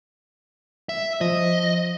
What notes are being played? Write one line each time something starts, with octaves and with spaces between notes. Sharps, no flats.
E5
F3 D#5